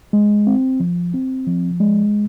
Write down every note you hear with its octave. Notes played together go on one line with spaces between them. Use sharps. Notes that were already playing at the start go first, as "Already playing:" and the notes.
G#3
C4
F3
C4
F3
G#3